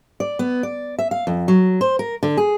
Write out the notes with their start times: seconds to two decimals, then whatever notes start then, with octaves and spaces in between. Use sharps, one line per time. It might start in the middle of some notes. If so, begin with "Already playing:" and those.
0.20 D5
0.39 B3
0.63 D5
0.99 E5
1.11 F5
1.27 F2
1.48 F#3
1.81 C5
1.99 A#4
2.23 D3
2.37 G#4